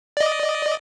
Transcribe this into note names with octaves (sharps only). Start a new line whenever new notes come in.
D5 D#5